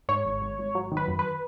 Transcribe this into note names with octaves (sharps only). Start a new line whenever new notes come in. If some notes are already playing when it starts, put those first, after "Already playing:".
G#2 C#5
G#1
G#1
G#1
F#3
D#3
B4
F#2
B4